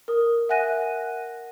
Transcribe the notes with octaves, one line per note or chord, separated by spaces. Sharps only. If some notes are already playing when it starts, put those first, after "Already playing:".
A#4 D#6
E5 F#5 G#5 F#6 A#6 D#7